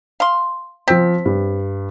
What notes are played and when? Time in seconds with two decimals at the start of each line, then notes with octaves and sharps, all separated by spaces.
0.20 F5 C6
0.88 F3 C4 B6
1.26 G2